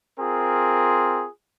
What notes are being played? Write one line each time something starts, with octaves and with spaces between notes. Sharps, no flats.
C4 F4 G#4 A#4